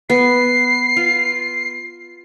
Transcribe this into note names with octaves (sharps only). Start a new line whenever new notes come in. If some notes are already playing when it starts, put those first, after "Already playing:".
B3 C7
F4